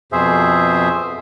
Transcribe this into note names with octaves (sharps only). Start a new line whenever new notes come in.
F2 B2 G#4 C5 E5